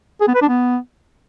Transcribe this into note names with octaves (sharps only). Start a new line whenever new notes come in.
G#4
B3
B4
D4
B3